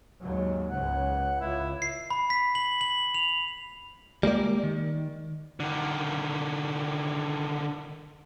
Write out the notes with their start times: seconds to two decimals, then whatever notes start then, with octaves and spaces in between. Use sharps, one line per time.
0.21 D#2 G#2 F#3
0.70 C#2 G#2 C#3 F#5
1.41 C#2 E4
1.82 C7
2.10 B5
2.30 B6
2.55 F#7
2.81 F#7
3.15 F7
4.23 G3 G#3 A#3 D5
4.64 D#3
5.60 D3 D#3